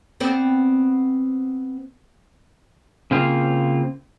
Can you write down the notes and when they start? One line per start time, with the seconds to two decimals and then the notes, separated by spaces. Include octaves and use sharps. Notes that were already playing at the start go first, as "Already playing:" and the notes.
0.20 B3 C4 D5
3.11 C#3 A#3 C4 F4